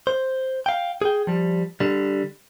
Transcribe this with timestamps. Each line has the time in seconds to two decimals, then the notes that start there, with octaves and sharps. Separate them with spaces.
0.07 C5
0.66 F5 G5
1.02 G#4 G5
1.27 F3 G3
1.80 D3 G3